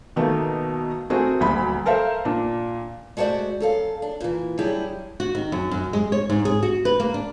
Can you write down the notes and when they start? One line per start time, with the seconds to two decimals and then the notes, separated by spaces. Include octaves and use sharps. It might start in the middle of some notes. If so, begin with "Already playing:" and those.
0.16 B2 D#3 A3 A#3
1.10 A3 C4 F#4 G#4 A#4
1.40 D#1 D2 F#3 B5
1.86 A4 A#4 C5 E5 F5
2.25 A#2 D4
3.17 G#3 A3 F#4 C5 D5 E5
3.60 F#2 A4 F5
4.02 D4
4.20 A#2 E3
4.59 F#3 G3 D4 E4 G4 G#4
5.20 F#4
5.35 D#3
5.52 F#2
5.71 F#2
5.93 G#3
6.12 C#5
6.30 G#2
6.45 G#4
6.63 F#4
6.85 B4
7.00 A#3
7.14 D4